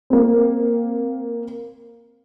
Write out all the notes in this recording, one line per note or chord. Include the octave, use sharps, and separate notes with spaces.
A#3 C4